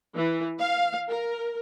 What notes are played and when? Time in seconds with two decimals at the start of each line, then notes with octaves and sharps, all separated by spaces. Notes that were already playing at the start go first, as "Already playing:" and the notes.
0.15 E3
0.58 F5
1.08 A#4